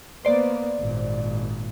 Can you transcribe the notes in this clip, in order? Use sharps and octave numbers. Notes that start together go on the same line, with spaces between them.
A#3 B3 C5 D5
G#1 A#2